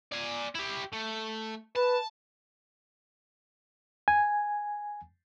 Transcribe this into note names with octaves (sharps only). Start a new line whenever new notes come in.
D5 G#5
E4 G4
A3
B4 A5
G#5